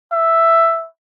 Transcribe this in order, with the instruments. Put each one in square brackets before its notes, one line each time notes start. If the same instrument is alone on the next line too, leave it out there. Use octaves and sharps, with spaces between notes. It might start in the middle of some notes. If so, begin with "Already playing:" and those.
[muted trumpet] E5